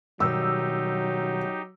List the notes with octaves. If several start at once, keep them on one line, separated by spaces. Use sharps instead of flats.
B2 D#3 F#3 G3 D#4 G4 E6